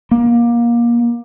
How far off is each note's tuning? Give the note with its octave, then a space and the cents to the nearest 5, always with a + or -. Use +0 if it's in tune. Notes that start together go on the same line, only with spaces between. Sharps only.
A#3 +25